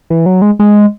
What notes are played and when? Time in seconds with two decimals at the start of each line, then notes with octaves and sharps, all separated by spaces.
0.10 E3
0.26 F#3
0.42 G#3
0.59 G#3